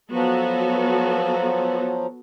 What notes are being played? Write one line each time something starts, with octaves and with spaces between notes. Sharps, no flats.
F3 F#3 B3 F#4 A4